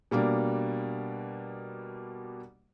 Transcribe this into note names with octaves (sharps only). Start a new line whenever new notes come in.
B2 G3 A#3 D4